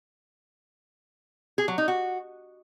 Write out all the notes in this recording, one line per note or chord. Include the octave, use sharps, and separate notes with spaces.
G#4
F#3
D#4
F#4